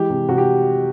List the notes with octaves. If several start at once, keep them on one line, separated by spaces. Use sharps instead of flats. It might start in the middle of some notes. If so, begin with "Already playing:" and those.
Already playing: E3 G#3 G4
C3
C3 F#4
G4